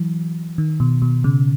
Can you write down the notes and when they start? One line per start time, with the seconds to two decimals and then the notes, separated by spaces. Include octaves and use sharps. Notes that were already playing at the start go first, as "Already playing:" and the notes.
Already playing: E3 F#3
0.58 D#3
0.80 B2
1.02 B2
1.24 C#3